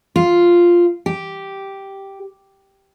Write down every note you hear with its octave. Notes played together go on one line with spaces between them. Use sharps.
F4
G4